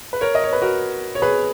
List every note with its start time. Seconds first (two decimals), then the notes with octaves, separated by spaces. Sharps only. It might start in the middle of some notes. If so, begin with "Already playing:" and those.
0.13 B4
0.21 A#4 C#5
0.35 D#5
0.44 C#5
0.53 B4
0.62 F#4 A#4
1.15 C#5
1.22 G#4 B4